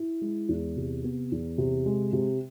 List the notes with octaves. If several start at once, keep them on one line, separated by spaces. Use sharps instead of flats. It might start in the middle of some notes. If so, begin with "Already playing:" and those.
Already playing: E4
G#3
E2
C3
B3
E2
C3
G#3
C3